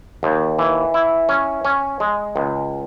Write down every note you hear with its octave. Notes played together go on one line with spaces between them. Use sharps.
D#2
E3
E4
C#4
C#4
G#3
C#2